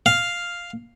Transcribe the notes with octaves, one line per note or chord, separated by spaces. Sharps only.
F5